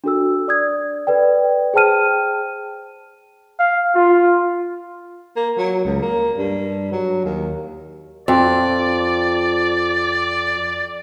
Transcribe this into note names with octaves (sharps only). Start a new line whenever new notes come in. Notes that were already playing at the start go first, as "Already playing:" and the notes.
D4 F#4 A4 E6
D5 D#6 G#6
A4 B4 D5 G5
G#4 C5 G5 A5 F6 D#7
F5
F4
A#3
F#3
C#2
A#3
G2
F#3
D#2
F2 D5